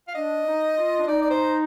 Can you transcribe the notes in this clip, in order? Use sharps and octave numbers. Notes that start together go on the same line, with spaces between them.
F5
D4 D#5
D#4
F4
D4
D#4 D5
D5
C5